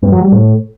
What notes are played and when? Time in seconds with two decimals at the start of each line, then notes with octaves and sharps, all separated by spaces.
0.02 G2
0.12 F#3
0.22 G3
0.32 A2